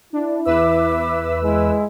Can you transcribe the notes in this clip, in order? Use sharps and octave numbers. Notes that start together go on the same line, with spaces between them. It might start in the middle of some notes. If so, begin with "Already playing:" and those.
D4 E4
E2 B4 E5 D6 E6
G#3 E4